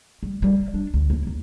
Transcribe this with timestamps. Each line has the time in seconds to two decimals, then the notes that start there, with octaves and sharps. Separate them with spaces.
0.23 G3
0.42 G3
0.74 D4
0.94 D2
1.10 D#2 E4
1.27 E2